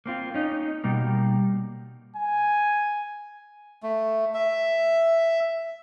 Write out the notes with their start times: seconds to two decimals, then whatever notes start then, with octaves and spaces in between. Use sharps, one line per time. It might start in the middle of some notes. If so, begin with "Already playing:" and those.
0.06 A#3 C4 F4
0.34 C#4 D#4
0.84 B2 G3 A#3
2.16 G#5
3.83 A3
4.34 E5